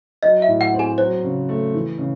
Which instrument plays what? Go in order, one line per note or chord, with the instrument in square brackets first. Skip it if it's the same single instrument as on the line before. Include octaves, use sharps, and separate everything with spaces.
[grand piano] F#3 [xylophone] D#5
[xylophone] E5
[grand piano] A2
[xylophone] F#5
[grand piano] C4
[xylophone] G#4 G#5
[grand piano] F#3 [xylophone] C5
[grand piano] C#3
A3
E3
C#3